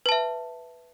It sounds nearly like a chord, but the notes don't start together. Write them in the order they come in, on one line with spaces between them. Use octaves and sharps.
B4 A5 E5